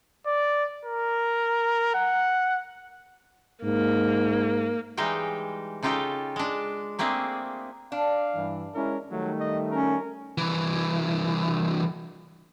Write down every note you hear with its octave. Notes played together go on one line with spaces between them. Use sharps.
D5
A#4
F#5
G#2 A#3
E3 G3 G#3 D#4 F5 G5
C#3 D#4 F4 G4 A4
G#3 D4
A3 A#3 C4 D4 G#4
D4 F5
G2 E3
G#3 C#4 E4 A#4
D#3 F#3 G3 A3
D#5
C#4 A#4
C2 E3